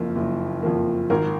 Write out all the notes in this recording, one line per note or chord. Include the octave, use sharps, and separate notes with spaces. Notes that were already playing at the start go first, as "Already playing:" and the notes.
Already playing: F#1 F2 F3 A#3
F#1
F2 F3 A#3
G#1 A#4